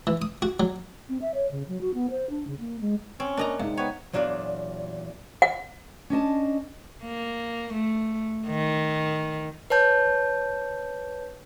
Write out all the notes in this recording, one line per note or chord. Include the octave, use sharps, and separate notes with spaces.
E3
D#6
F#4
F#3
C4
E5
C#5
C#3
F#3
F#4
B3
C5
D4
C#3
A#3
G#3
C4 C#4 C#6
A#3 D4 A#4 D#5 A#5
C3 G#3 C4 D#4 F5
B3 C#5 G5
E2 A#2 F#3 D4 D5 F5
F#5
C#4 D4 D#5 A5
A#3
A3
D#3
B4 C#5 A5 G6